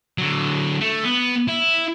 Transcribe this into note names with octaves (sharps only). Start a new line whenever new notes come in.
D3 F#3
A3
B3
E4